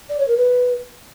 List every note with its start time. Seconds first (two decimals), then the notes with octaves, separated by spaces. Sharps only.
0.09 D5
0.18 C#5
0.28 A#4
0.37 B4